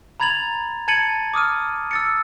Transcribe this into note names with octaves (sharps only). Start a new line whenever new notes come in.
A#5 B5 G#6 A6 F7 F#7
A5 G#6 A6 C#7 D#7 F#7
D6 D#6 F6 D#7
E6 A6 C#7